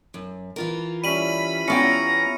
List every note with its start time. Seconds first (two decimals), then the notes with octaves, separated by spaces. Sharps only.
0.14 F#2
0.56 E3 F4 A#4
1.04 G3 C#4 E4 B5 D#7 F#7
1.68 E2 B3 C#4 E4 F4 G5 A#5 C#7